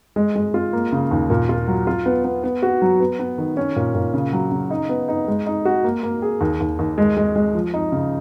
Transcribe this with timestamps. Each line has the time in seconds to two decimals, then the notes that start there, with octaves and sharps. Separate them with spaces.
0.16 G#3
0.35 G#3
0.54 F4
0.73 A#3
0.92 C#3
1.11 D#2
1.30 A#2
1.49 F4
1.68 F#3
1.87 F4
2.06 B3
2.25 B3
2.44 B3
2.63 F#4
2.82 F#3
3.00 B3
3.19 B3
3.38 D#3
3.57 C#4
3.76 A#2
3.95 A#2
4.14 C#3
4.33 F#3
4.51 C#3
4.71 D#4
4.89 B3
5.09 D#4
5.28 G#3
5.46 D#4
5.65 F#4
5.84 A#3
6.03 A#3
6.22 G#4
6.41 D#2
6.60 D#2
6.79 D#2
6.98 G#3
7.17 G#3
7.36 G#3
7.55 F3
7.74 D#4
7.92 C#3